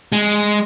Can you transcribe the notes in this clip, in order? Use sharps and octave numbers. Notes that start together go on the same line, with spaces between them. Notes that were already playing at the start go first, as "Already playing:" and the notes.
G#3